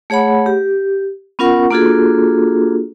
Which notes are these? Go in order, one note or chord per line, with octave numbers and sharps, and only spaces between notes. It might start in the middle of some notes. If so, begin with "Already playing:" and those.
A3 G#4 C#5 F#5 B5
G4
B3 C#4 F4 A#4 F#5 C#6
A#3 D4 F4 F#4 G#4 A4